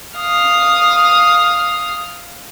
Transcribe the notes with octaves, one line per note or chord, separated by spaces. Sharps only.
F5 D#6